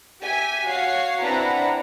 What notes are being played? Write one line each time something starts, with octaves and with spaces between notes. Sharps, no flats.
G4 E5 G#5
F#4 C#5 F5 C7
C4 D4 E4 B4 F#5 A#5